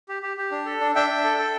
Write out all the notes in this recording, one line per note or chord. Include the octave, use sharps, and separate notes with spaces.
G4
G4
G4
D4
A4
D4
D4 E5 G5
D4
A4
A4